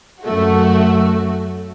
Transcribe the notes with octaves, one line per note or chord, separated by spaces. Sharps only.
F#2 A3 F#4